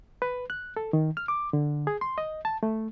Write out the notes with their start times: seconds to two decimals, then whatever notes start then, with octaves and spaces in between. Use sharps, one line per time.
0.22 B4
0.50 F#6
0.77 A4
0.93 D#3
1.17 F6
1.28 D6
1.53 D3
1.87 G#4
2.01 C6
2.18 D#5
2.45 A5
2.63 A3